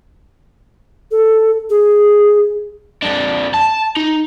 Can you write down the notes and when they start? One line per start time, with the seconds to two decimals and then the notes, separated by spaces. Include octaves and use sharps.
1.11 A4
1.70 G#4
3.03 F2 D4
3.54 A5
3.97 D#4